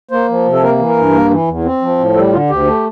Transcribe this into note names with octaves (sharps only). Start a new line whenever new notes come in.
A#3 C5
F3
C3
A4
A#3 A#4
E3
A#4
G2
A#3
E3
E2
C4
F3
A2
G3 A4
D3 F4
D2 G4
A3